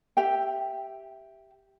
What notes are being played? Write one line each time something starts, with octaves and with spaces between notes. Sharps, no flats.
G4 E5 G5